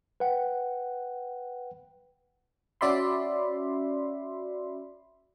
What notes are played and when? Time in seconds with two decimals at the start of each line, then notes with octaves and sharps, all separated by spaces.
0.20 B4 F#5 G5
2.81 C#4 F#4 D5 E5 B5 C6